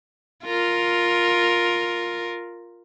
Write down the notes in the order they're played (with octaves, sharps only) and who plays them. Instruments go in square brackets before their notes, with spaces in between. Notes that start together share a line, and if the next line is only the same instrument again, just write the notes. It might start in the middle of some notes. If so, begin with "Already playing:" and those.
[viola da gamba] F4 A#4